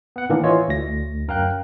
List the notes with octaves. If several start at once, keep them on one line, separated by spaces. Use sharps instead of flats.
B3 F#5
A2 D#3 E3 A#3 D4
E3 F4 C#5 D#5
D2 A#6
F#2 A#4 F5 G5 F#6